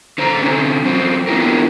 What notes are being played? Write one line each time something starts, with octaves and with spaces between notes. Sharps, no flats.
D3 C5 A#5
D3 C4 C#4
F#2 C4
B3 D4 E4 F4 G4 A#4